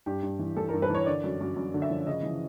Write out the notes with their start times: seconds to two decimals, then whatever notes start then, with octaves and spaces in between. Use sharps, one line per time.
0.06 G2 G4
0.23 G2
0.39 E3
0.57 E3 A4
0.69 G2 A#4
0.82 B4
0.90 E3 C#5
1.06 D3 D5
1.24 F#2
1.41 F#2
1.56 F#2
1.74 D3
1.82 E5
1.90 F3
2.07 C#3 D#5
2.23 E3